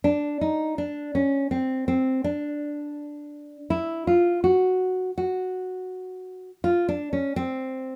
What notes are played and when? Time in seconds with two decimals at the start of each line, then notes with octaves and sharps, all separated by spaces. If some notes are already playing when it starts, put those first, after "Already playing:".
0.04 D4
0.41 D#4
0.78 D4
1.15 C#4
1.51 C4
1.88 C4
2.24 D4
3.70 E4
4.07 F4
4.44 F#4
5.18 F#4
6.64 F4
6.89 D4
7.13 C#4
7.36 C4